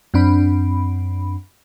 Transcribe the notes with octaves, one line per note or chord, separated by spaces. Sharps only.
F#2 C4 D4 B5